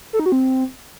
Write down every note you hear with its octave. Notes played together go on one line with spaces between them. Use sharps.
A4
D#4
F#4
C4